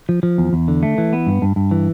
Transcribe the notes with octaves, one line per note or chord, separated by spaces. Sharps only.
F3
F3
E2
E2
D3
A3
E3
B3
G2
G2
G2
E3